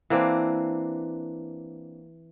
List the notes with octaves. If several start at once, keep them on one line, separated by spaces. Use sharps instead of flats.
E3 A#3 C4 D4